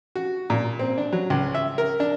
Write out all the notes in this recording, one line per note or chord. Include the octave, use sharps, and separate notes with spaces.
F#4
A#2
C4
D4
F#3
C#2
E5
A#4
D4